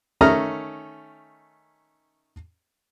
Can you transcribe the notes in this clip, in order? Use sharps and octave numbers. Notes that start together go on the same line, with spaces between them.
D#3 A3 C#4 A#5 D#6 F6